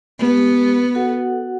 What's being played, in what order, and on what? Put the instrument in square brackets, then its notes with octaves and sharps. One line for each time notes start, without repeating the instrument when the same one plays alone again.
[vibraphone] G#3 G4 [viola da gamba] B3
[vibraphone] F#4 A4 F#5